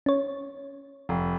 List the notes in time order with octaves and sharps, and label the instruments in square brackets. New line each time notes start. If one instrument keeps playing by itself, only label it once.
[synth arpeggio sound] C#4 C#5
[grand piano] F1